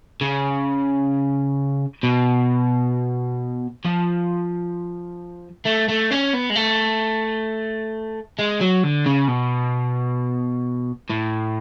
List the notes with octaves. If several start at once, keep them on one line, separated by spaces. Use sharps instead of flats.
C#3
B2
F3
A3
A3
C#4
B3
G#3
A3
G#3
F#3
D3
C#3
B2
A2